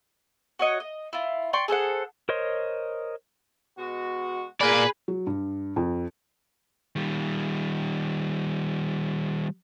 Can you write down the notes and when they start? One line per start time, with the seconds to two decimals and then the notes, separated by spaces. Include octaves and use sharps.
0.59 F#4 C#5 D#5
0.80 D#5
1.13 E4 F4
1.53 D5 G5 C6 C#6
1.68 G#4 A4 C5 F#5
2.29 A#4 C5 C#5 D#5 C6
3.78 B2 G#3 F#4
4.61 A#2 G#4 A#4 B4 D5
5.08 F#3
5.27 G2
5.76 F2
6.96 D#3 G3